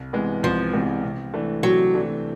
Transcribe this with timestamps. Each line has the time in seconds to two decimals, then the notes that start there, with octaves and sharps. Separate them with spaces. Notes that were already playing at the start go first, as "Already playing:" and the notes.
Already playing: C2
0.13 C3 E3 G#3 B3
0.43 C2 F3
0.73 C3 E3 G#3 B3
1.03 C3
1.34 E3 A3 D4
1.63 C3 F#3
1.94 E3 A3 D4